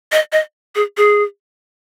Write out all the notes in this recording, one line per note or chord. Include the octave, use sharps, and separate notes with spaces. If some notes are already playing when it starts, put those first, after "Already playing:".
D#5
D#5
G#4
G#4